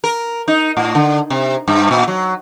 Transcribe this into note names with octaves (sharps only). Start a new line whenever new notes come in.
A#4
D#4
A2
D3
C3
G2
A#2
F#3